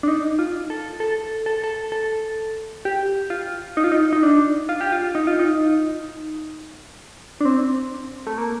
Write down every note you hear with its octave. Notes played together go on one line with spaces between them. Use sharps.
D4
D#4
F4
A4
A4
A4
A4
A4
G4
F4
D#4
F4
D#4
D#4
D4
F4
G4
F4
D#4
F4
D#4
D4
C4
A3
A#3